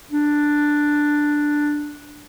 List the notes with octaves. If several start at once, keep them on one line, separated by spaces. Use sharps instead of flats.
D4